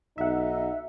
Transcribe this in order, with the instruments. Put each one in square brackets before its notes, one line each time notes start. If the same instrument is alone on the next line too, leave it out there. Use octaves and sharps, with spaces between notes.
[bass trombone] B1 [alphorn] D#4 [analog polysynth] E5 F#5